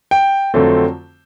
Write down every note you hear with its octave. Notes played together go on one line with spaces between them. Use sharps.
G5
F2 D3 F#3 A3 C4